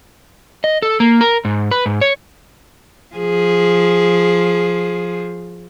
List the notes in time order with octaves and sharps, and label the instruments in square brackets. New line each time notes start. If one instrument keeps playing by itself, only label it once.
[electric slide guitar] D#5
A4
A#3
A#4
G#2
B4
G#2
C#5
[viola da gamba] F3 G#4